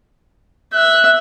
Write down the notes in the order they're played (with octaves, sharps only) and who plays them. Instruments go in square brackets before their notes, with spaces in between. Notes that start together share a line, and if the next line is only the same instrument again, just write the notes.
[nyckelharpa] E5 [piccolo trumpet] F#6